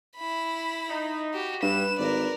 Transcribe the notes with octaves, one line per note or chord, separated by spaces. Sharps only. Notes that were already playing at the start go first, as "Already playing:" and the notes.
E4 B5
D#4
F#4 G4
G2 B4 E7
G#1 A#4 D5